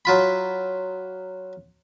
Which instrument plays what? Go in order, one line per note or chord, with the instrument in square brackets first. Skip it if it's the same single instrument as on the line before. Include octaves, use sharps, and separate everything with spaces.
[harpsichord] F#3 F4 B5